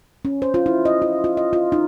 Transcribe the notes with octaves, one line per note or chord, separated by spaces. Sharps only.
C#4
C5
F4
E4
D#5
F4
F4
D#5
F4
D#4